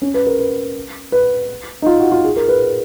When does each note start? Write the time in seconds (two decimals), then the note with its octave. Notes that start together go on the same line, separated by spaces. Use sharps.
0.02 C#4
0.14 B4
0.27 A#4
0.39 B4
1.12 B4
1.82 D#4
1.86 F4
1.99 F#4
2.12 F4
2.25 G#4
2.36 A#4
2.48 B4